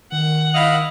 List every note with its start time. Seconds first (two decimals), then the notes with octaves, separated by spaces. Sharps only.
0.12 D#3 F#5
0.54 E4 D#5 F5